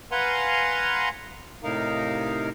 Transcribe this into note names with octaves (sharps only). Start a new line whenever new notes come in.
B4 F5 F#5 G#5 A#5 C6
A2 C3 D#4 A#4 F5